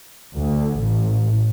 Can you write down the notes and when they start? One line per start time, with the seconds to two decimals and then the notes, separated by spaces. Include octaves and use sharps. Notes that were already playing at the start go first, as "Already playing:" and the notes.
0.36 D2
0.81 A1